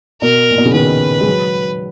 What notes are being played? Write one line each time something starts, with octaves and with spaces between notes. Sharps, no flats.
B2 A#4
A#2
B2
C#3
D#3 B4
G#3
F#3